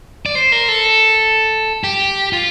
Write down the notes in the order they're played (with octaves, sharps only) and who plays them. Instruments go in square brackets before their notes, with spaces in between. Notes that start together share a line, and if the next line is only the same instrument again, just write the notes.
[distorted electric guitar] D5
C5
A#4
A4
G4
F4